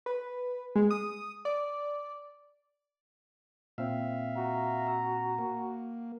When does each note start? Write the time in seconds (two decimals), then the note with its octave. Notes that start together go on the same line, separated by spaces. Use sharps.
0.06 B4
0.76 G#3
0.91 D#6
1.45 D5
3.78 A#2 C4 E5 F5
4.37 F#4 A#5
5.38 A#3